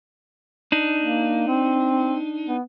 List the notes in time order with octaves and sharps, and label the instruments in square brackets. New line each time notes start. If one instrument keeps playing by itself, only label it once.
[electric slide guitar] D4 D#4
[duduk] A#3
C4
B3